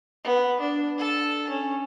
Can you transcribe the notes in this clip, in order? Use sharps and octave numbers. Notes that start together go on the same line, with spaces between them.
B3
D4
A4 A5
C#4